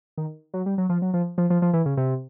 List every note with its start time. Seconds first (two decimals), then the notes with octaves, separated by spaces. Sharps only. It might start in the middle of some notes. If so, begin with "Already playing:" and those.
0.17 D#3
0.54 F#3
0.66 G3
0.78 F#3
0.89 F3
1.02 F#3
1.14 F3
1.38 F3
1.50 F3
1.62 F3
1.73 E3
1.86 C#3
1.97 C3